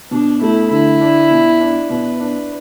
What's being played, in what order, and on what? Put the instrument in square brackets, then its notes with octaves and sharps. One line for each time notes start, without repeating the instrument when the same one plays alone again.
[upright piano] B2 [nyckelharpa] D4
[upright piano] A3 [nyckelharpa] E4
[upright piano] D3 [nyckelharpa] E4
[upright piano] D4
B2
D4
[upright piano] B2 [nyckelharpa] B4
[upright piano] D4